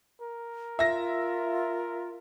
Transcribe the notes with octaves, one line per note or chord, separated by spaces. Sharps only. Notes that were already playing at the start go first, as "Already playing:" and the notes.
A#4
F4 E5 A#6